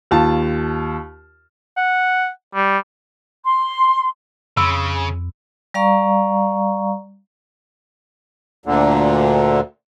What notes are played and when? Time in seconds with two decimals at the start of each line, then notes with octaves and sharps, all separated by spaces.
0.11 D#2 F4 A5
1.77 F#5
2.55 G3
3.45 C6
4.57 F2 C#3 B5 C6 E6
5.74 G3 D5 F5 A#5 C#6
8.66 D2 A#2 D3